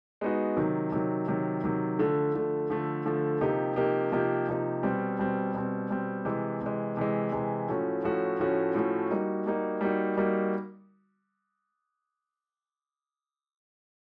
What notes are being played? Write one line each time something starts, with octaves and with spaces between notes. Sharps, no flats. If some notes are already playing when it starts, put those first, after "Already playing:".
G#3 B3 D#4 F#4
C3 D#3 F#3
C3 D#3 F#3
C3 D#3 F#3
C3 D#3 F#3
D3 F3 A3
D3 F3 A3
D3 F3 A3
D3 F3 A3
C3 F3 A#3 D#4 G4
C3 F3 A#3 D#4 G4
C3 F3 A#3 D#4 G4
C3 F3 A#3 D#4 G4
B2 G3 C4
B2 G3 C4
B2 G3 C4
B2 G3 C4
C3 E3 G#3
C3 E3 G#3
C3 E3 G#3
C3 E3 G#3
A2 F3 A3 C#4 F#4
A2 F3 A3 C#4 F#4
A2 F3 A3 C#4 F#4
A2 F3 A3 C#4 F#4
G3 A#3 D#4 F#4
G3 A#3 D#4 F#4
G3 A#3 D#4 F#4
G3 A#3 D#4 F#4